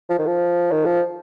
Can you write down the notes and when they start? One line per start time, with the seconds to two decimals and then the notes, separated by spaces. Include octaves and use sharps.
0.10 F3
0.19 D#3
0.27 F3
0.71 D#3
0.85 F3